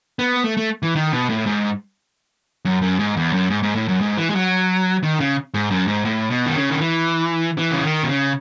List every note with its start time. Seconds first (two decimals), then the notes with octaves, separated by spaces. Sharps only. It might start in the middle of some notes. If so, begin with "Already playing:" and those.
0.19 B3
0.44 A3
0.57 A3
0.83 E3
0.96 D#3
1.12 B2
1.29 A2
1.46 G#2
2.65 F#2
2.82 F#2
2.99 G#2
3.17 E2
3.33 F#2
3.50 G#2
3.63 G#2
3.75 A2
3.88 F#2
4.01 G#2
4.17 E3
4.30 G#3
4.35 F#3
5.03 D#3
5.20 C#3
5.54 G#2
5.71 F#2
5.88 G#2
6.05 A2
6.30 B2
6.46 D#3
6.56 C#3
6.70 D#3
6.81 E3
7.58 E3
7.72 C#3
7.83 D#3
8.03 B2
8.09 C#3